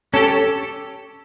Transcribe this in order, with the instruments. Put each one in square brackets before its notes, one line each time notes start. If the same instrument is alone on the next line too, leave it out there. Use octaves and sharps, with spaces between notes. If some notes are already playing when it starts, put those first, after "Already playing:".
[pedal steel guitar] C#4 G4 C#5 [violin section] A4